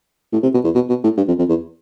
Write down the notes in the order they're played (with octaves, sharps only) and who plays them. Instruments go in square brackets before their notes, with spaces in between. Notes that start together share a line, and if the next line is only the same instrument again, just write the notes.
[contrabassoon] A2
C3
B2
E2
B2
B2
A2
G2
F2
F2
E2